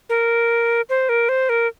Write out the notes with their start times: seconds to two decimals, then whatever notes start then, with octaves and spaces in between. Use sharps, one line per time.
0.09 A#4
0.89 C5
1.09 A#4
1.29 C5
1.49 A#4